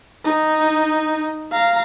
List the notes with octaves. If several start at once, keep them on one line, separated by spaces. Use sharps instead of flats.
D#4
F5 A#5